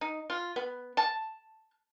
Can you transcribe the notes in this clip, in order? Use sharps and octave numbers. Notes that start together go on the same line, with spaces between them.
D#4
F4
B3
A5